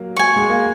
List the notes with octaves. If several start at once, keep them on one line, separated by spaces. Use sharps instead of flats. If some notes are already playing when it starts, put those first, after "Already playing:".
Already playing: F#3 A#3
G#5 C#6
G#3
A#3